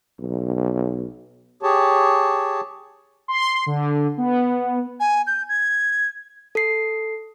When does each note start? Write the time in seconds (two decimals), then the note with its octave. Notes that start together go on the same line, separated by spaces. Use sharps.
0.20 B1
1.63 G4 G#4 C#5 A5
3.28 C6
3.66 D3
4.17 B3
5.00 G#5
5.27 G6
5.49 G#6
6.55 A4 C7